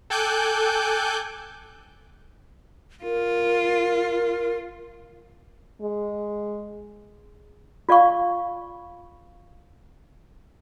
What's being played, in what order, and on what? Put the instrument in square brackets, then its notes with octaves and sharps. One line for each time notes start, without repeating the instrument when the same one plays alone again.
[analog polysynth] A4 G5 G#5 D6 F#6 G6
[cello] F4 [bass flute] A#4
[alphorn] G#3
[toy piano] F4 D5 F5 C#6